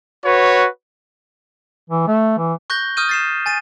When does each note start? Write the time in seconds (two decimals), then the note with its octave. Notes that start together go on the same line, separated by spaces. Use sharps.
0.24 F#4 B4 C#5
1.90 E3
2.07 A3
2.38 E3
2.70 C#6 F#6 G6 A#6 G7
2.97 C#6 D#6 F6 G6 D#7
3.09 A6 C7 E7
3.46 G#5 A6 D#7